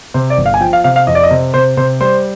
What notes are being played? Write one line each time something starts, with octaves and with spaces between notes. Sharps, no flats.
C3 C5
D5
G1
F5
G#5
F3 G5
F5
C3 F5
F5
F2 D#5
D5
D#5
C3
C3 C5
C3 C5
G3 C5